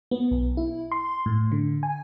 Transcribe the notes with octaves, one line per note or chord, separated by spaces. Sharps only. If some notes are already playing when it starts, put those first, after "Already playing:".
B3
B1
E4
C6
A2
D3
G#5